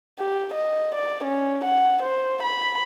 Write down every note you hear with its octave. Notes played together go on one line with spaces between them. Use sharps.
G4
D#5
D5
C#4
F#5
C5
B5